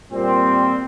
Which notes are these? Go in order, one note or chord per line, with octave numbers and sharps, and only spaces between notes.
A#2 G3 C4